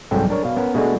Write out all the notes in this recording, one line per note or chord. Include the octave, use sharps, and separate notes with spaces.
C2 G#2 F#3 C4 A4 G5
D4 A#4 C#5
B2 F5
B3 C#4 A#4
B2 G#3 A3 D4 F#4 G#4